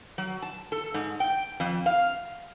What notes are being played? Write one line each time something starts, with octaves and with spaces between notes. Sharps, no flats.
F#3
A5
A4
G#2
G5
F2
F5